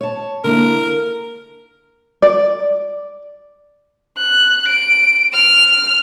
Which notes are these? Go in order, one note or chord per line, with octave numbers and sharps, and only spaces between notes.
C#5 A5
D3 A#3 E4 A#4
D5
F#6
D7
F6